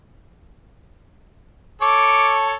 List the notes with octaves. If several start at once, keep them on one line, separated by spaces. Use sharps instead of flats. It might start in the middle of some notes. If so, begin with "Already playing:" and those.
A4 C#5 D6